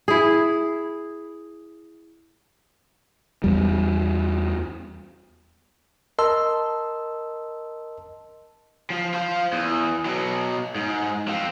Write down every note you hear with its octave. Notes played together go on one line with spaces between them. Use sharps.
E4 G#4
E2 G3
A#4 D#5 A5 C6 E6
F3
F4 C5
E2
B2 F#3
G#2
F3 C4